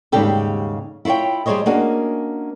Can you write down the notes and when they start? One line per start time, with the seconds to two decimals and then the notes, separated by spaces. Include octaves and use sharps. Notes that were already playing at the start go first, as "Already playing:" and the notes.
0.12 D#2 G#2 C#3 G3 G4 A4
1.05 E4 F4 C5 C#5 G5
1.46 G3 G#4 A#4 C5 C#5 D#5
1.66 A#3 C#4 D4 F#4 G#4